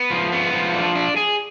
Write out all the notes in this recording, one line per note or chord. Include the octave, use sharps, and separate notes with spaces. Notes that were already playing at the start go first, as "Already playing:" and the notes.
Already playing: B3
F3
B3
F3
D4
D4
G#4